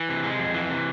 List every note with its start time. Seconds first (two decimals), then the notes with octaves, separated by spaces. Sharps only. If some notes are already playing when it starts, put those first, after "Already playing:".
Already playing: E3
0.09 C3
0.24 G#3
0.39 F2
0.54 E3
0.69 C3